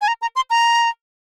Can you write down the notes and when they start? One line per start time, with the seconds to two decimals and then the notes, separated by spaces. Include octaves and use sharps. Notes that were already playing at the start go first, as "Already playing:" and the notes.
0.02 G#5
0.08 A#5
0.22 A#5
0.36 C6
0.50 A#5